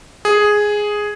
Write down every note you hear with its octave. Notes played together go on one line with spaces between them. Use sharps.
G#4